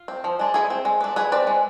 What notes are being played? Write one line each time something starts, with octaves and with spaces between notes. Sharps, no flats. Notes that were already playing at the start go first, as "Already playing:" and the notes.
Already playing: F4
C4
F3
G#3 D4
G#3 E4 G#4
C4
G#3
B3 D4
G#3 G#4 B4
C4 B4 D5
G#3